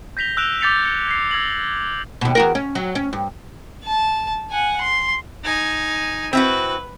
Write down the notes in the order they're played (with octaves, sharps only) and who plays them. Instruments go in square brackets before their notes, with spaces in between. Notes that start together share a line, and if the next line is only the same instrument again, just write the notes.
[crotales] G6 A#6 B6 F7 G7
E6 F#6 D7 E7 F7
D6 G6 A6 B6 C#7 F7
G#6 A6 C#7
G#6 B6 C7
E6 G#6 A#6 C#7 F#7
[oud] D#2 B2
E2 F#4 A#4
C#4
F#3
C#4
G2
[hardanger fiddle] A5
F#5 G#5
C6
[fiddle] D#4 G#5
[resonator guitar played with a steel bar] C4 E4 F#4 [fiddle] B4